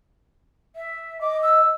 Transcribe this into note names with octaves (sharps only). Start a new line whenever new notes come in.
E5
D#5 D6
E6